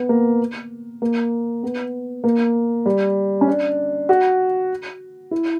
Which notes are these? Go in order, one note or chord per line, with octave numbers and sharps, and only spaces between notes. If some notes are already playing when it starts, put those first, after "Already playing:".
Already playing: B3
A#3
A#3
B3
A#3
G3
C#4
D4
F#4
E4